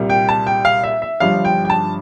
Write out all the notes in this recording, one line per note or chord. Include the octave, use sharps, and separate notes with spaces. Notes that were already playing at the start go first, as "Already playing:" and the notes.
Already playing: C2 A#2 G3
G5
A5
G5
F5
E5
E5
G1 G2 F3 F5
G5
G5
A5